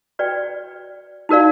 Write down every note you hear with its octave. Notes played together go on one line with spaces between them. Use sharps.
F#4 B4 D5 G5
D#4 F#4 A#4 D5 F5